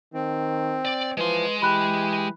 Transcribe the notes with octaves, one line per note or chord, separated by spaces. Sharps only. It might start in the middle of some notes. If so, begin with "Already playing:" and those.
D#3 C4
D5
E3 F3 G#3 B4 C6
E3 G4 B5 F#6